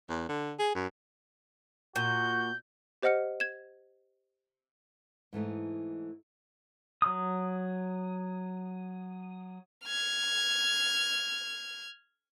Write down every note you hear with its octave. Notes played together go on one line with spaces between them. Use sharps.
E2
D3
G#4
F#2
A#2 F#4 G6
G4 C5 D#5 F#5 F6 C#7
G#6 E7
G#2 E3 A3 D#4
F#3 D#6
F6 G#6